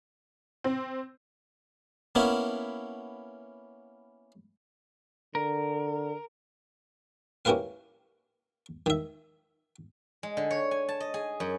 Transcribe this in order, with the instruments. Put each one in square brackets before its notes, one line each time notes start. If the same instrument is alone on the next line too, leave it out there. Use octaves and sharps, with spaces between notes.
[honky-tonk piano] C4
[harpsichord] A#3 B3 C#4 E4
[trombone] D3 [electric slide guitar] A#4
[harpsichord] C#4 E4 G4 A#4 B4 F5
D#3 E5
[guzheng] G#3
D3
C#5
G#5
A5
D#5
G#4
F#2